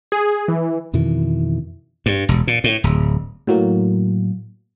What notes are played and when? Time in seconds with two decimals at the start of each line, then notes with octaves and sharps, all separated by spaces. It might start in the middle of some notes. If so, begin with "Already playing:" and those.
0.12 G#4
0.48 E3
0.93 F2 B2 D#3 E3
2.06 G2
2.29 E1
2.47 A#2
2.64 A2
2.84 D1
3.47 A2 F#3 A#3